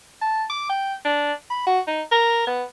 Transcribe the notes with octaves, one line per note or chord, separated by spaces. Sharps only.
A5
D6
G5
D4
B5
F#4
D#4
A#4
B3